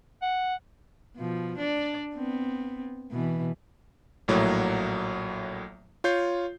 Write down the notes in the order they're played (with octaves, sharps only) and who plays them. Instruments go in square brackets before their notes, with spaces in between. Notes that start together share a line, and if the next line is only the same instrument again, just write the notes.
[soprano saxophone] F#5
[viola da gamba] B2 F3
D4 D5
B3 C4
B2 E3
[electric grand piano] A#1 A2 F#3 A#3
F4 C#5 G6 C7